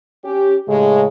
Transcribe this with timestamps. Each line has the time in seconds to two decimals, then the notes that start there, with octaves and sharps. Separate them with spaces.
0.25 C#4 G4
0.69 A2 C#3 G#3